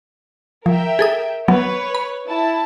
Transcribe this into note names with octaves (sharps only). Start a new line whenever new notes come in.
F3 A#4 E5 G5
G#4 A4 D#6
F#3 B3 B4 C#5
B5
E4 A5